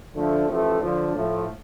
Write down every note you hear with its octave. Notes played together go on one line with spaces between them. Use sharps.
D3 F3 A3
A1 A2 F3 A3
D3 F3 D4
A2 F3 A3